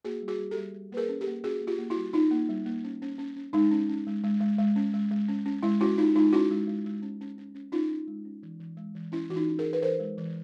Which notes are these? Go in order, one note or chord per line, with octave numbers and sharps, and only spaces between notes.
A#3 F#4 G#4
G3
F#4 G#4
G3
G4 A4
G3
G3
A#3 G#4 A#4 B4
C#4
G4 A4
A#3
C#4 F#4 G#4
A#3
F4 G4
A#3
E4 F#4
G3
C#4 D#4 F4
A#3
G3
A#3
C#4
C#4
C#4
C#4
G#3 D#4
C#4
C#4
G#3
G#3
G#3
G#3
C#4
G#3
G#3
C#4
C#4
G#3 E4
C#4 E4 F#4
C#4 D#4 F4
G#3 D#4 F4
C#4 E4 F#4
G#3
G#3
G#3
C#4
C#4
C#4
C#4
C#4 D#4 F4
C#4
G#3
C#4
E3
E3
G#3
E3
C#4 E4
E3 F#4
D#4 F4
C#4
G#4 A#4
E3
B4
E3 A#4 C5
G#3
E3